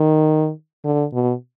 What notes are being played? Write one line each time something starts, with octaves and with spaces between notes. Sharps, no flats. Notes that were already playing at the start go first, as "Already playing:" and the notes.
Already playing: D#3
D3
B2